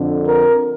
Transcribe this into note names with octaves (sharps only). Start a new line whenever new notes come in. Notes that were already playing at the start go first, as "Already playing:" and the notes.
Already playing: F2 D3
A#4